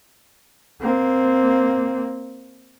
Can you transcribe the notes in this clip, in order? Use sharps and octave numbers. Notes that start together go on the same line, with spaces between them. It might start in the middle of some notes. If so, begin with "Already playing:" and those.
A#3 C4